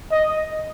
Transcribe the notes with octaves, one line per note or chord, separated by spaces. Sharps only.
D#5